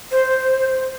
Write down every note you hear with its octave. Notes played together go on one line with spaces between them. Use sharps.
C5